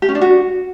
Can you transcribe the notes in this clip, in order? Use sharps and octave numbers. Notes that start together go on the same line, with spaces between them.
G4
C#4
D4
F#4